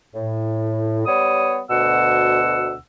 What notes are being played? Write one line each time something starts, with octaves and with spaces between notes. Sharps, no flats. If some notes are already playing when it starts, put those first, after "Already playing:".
A2
G3 B3 C#5 D#6
D2 B2 F#5 E6